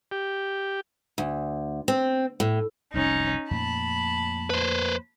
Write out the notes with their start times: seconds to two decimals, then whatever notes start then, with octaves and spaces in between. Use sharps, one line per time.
0.11 G4
1.18 D2
1.88 C4
2.40 A2
2.94 F1 C2 F#2 C#4 D#4
3.51 F2 A#2 A3 A5 B5
4.50 B4 C5